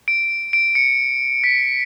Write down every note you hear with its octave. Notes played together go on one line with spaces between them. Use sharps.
D7
D7
C#7
B6